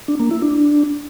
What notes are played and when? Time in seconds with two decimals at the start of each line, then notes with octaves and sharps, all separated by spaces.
0.08 D4
0.19 A#3
0.31 E4
0.42 D4